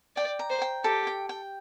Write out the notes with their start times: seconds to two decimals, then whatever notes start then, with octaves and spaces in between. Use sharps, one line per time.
0.16 D5 G5
0.39 A#5
0.50 C5
0.62 G5
0.84 G4 A4
1.07 G5
1.29 G5